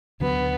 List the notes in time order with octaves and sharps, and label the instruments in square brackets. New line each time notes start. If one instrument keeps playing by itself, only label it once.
[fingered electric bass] D2 D3 F#3 [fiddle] B3